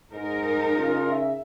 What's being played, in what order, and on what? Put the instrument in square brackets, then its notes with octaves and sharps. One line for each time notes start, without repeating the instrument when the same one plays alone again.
[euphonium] G#2 [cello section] D#4 A#4
[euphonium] C#3 [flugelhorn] F4
[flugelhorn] E5